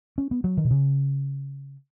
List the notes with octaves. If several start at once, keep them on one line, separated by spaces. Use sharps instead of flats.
C#4
B3
F#3
D#3
B2
C#3